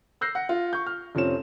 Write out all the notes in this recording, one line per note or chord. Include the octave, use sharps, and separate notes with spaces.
E6 F#6 G6 A#6 C7
F#5
F4
C#6 G6
F6
F1 F3 C4 C#4 E7